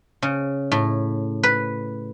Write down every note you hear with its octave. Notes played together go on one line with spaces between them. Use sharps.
C#3
A2
B4